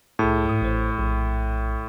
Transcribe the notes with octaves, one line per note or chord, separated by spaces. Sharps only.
C2 A2 G#4 A5
G#2 D#6
A1 C5
A#1